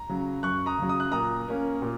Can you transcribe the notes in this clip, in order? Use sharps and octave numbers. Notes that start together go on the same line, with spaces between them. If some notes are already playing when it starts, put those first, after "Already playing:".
Already playing: A#5
C#3 F#3
F#2 C#6 F#6
A#5 D#6
C#3 F#3
D#6
F#6
A#2 A#5 D#6
A#3 C#4
A#2